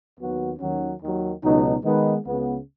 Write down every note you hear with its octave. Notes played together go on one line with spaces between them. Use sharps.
D#2 D#3 F#3 B3 F#4
D#2 D#3 F#3 C#4 F#4
D#2 D#3 F#3
C#2 B2 F#3 D#4
D#3 G#3 B3 D#4 B4
C#2 C#3 B3